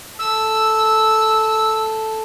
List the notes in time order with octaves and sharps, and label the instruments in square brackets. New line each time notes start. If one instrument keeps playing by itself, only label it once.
[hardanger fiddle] A4 [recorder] E6